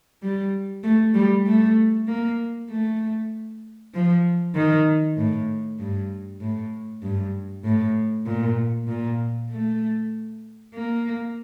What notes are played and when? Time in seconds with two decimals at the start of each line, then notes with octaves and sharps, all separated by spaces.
0.22 G3
0.83 A3
1.14 G3
1.47 A3
2.08 A#3
2.70 A3
3.94 F3
4.55 D#3
5.17 A2
5.79 G2
6.41 A2
7.03 G2
7.64 A2
8.27 A#2
8.88 A#2
9.50 A3
10.74 A#3